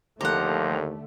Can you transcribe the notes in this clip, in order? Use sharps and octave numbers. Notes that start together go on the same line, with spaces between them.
D#2 D3 F3 A3 G4 F#5 A#5